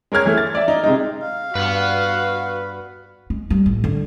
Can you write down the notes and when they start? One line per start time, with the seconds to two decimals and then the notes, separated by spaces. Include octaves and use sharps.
0.12 G#3 A#4 C#5 F6 G#6
0.26 E3 A3
0.37 A6
0.55 D5 E5
0.68 D#4
0.84 C3 G#3 D#4
1.22 F5
1.55 G2 F#4 B4 F#5
3.30 G#3
3.50 G3
3.66 A1
3.84 D3